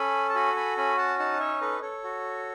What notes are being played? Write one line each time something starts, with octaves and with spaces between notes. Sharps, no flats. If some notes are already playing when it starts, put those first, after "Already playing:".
Already playing: C#4 A4 G#5 B5
A5
F#4 G#5 B5
G#5 B5
C#4 G#5 B5
F#5 A5
D#4 F#5 A5
C#5 E5
A4 B4 D#5
A4 C#5
F#4